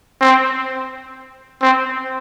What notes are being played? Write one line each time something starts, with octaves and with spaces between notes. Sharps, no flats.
C4
C4